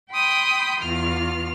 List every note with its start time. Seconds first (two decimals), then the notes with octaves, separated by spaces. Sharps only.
0.11 G5 B5 C6 D#6 G6
0.82 E2 F4 F6